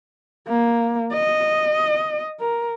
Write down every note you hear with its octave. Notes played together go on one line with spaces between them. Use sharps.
A#3
D#5
A#4